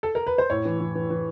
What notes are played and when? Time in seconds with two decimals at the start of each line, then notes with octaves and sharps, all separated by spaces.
0.03 A4
0.15 A#4
0.27 B4
0.38 C5
0.50 A2 C#5
0.65 E3
0.80 E3
0.95 E3
1.10 E3